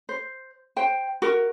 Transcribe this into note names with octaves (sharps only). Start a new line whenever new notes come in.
C5
C5 G5
F#4 A#4